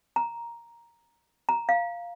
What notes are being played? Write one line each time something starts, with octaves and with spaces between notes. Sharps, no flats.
A#5
A#5
F5